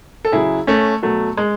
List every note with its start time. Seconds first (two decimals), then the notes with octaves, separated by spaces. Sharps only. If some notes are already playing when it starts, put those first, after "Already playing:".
0.25 A4
0.32 C#3 F#3 E4 G#4
0.67 A3 C#4
1.02 B2 F#3 A3
1.37 G#3